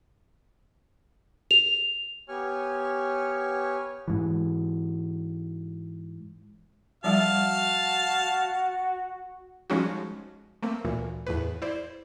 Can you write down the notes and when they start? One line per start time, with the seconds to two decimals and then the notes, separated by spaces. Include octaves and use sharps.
1.51 F7
2.28 B3 G4 C#5 G#5 C#6 F6
4.08 G#2 E3
7.04 F3 G3 F#4 F5 A5
9.70 F3 G3 G#3 C#4 D#4 F#4
10.63 A3 A#3 C4
10.85 D2 A#2 E3
11.27 E2 A2 B4
11.62 E4 C5 D5